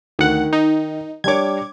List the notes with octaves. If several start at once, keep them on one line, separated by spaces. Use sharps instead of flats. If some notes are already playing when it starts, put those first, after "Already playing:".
D2 D#3 F#5
D#4
G3 D4 C#5 D6 G#6